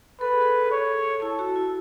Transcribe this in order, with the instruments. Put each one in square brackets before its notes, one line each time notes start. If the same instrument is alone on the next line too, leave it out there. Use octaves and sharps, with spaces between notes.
[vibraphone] A4 [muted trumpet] B4
[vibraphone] G#4
A4
[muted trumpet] C#5
[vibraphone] E4 [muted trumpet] A4
[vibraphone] F#4
E4